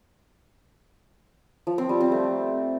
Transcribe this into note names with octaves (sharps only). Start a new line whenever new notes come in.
F3
C4
G3
C4
A3